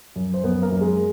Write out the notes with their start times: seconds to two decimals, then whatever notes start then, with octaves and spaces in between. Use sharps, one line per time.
0.16 F#2
0.34 C5
0.44 F#2 B3 B4
0.62 A#3 A#4
0.72 F#2
0.81 G#3 G#4